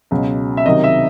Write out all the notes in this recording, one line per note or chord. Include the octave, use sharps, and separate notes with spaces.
C#2 B2 F#3
E5
C2 C3 D#3 F#3 D#5
E5